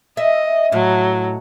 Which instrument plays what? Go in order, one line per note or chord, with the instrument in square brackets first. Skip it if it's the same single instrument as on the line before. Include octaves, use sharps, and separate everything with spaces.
[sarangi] D#5 [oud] E5
[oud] A2 [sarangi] F#3